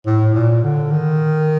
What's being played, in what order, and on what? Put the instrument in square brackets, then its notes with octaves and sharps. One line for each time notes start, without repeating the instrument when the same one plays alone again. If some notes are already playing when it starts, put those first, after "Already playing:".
[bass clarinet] A2
A#2
D3
D#3